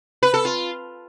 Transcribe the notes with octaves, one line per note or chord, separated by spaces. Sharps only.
B4
A4
F4